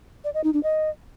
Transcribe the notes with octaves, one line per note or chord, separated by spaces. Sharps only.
D5
D#5
D#4
D4
D#5